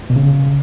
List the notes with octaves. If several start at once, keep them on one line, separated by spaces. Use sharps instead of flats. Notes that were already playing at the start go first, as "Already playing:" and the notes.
B2
C#3